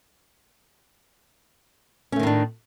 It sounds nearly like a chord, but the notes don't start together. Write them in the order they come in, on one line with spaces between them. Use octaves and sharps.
C#4 A3 D#3 A2 D4